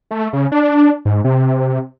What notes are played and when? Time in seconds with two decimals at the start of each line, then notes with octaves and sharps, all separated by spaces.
0.11 A3
0.33 C#3
0.52 D4
1.05 G#2
1.24 C3